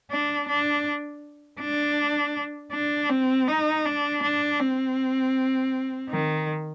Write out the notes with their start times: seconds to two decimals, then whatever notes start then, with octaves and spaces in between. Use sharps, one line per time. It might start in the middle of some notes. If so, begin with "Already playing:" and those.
0.11 D4
0.48 D4
1.60 D4
2.73 D4
3.10 C4
3.48 D#4
3.85 D4
4.23 D4
4.60 C4
6.09 D#3